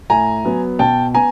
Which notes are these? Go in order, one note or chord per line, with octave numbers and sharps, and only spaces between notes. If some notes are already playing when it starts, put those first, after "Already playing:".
A2 G#5 A#5
F#3 B3
B2 G5 A5
B3 G#5 A#5